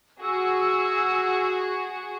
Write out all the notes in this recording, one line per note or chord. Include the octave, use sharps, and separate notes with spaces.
F#4 G#4 E6